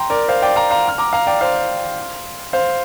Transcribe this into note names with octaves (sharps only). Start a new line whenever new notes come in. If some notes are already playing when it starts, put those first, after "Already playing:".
Already playing: G5 A#5 C6
A#4 D5
C5 F5
D5 G5
F5 A#5
F5 A#5
F6
A#5 D6
F5 A#5
D5 G5
C5 F5
C5 F5